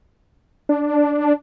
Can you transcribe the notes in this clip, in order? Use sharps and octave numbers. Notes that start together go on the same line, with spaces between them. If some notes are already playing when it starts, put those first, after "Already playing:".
D4